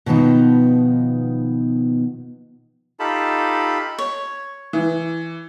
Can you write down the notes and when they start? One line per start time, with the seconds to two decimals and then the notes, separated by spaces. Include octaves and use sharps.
0.06 B2 D#3 F3 B3 D#4
3.00 D#4 F4 G4 A4 A5 B5
3.99 C#5
4.73 E3